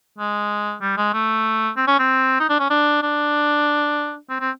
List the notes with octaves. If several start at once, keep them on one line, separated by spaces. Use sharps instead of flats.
G#3
G3
G#3
A3
C4
C#4
C4
D#4
D4
C#4
D4
D4
C4
C4